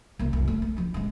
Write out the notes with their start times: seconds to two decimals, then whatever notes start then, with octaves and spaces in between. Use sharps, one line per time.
0.19 C2 A#3
0.33 C2 F#2
0.48 A3
0.62 A3
0.77 F3 D4
0.94 A1 G#3